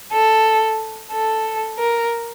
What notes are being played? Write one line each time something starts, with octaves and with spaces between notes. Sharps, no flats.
A4
A4
A#4